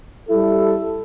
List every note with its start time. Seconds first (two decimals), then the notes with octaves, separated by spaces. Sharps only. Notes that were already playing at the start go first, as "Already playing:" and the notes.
0.29 G3 E4 A4